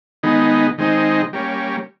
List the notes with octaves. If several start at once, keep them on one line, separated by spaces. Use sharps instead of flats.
D#3 G#3 B3 D#4
D#3 G#3 C4 D#4
G3 A#3 C#4